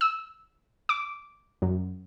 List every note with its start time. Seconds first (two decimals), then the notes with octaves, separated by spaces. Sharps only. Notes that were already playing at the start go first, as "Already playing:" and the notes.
0.01 E6
0.89 D6
1.62 F#2